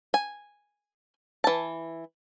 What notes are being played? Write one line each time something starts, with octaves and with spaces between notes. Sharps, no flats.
G#5
E3 A5